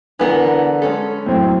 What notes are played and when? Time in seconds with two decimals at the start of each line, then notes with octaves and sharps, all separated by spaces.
0.20 D3 E3 B3 A#4 B4
0.82 G#3 C#4 A4
1.26 F#2 A2 C4